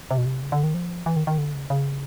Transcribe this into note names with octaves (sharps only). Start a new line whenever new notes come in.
C3
B2
C3
C#3
D3
D#3
F3
E3
D#3
D#3
D3
C#3
C#3